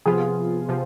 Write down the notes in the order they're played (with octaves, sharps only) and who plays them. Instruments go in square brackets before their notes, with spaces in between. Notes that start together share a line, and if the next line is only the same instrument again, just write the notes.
[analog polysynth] C3 F3 B3 F4 [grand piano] G#4
[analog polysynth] C3 F3